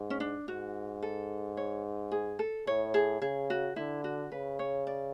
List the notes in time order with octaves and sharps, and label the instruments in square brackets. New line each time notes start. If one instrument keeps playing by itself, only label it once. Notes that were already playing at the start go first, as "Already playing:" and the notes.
Already playing: [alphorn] G#2
[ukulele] C#4
D4
[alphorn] G#2 [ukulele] F#4
[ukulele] A4
C#5
G#4
A4
[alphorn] A2 [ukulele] C#5
[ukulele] G#4
[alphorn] C#3 [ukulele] G#4
[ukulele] F#4
[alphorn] D3 [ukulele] E4
[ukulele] F#4
[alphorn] C#3 [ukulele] B4
[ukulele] C#5
D5